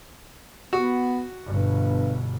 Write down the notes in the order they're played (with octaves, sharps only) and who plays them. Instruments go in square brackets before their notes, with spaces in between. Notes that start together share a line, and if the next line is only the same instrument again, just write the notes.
[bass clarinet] B3 [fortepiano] F#4
[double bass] G1 B2 [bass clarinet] G2